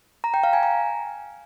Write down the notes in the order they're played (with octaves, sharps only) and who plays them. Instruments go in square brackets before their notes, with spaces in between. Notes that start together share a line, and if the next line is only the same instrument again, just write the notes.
[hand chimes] A#5
G5
F5
G#5
A#5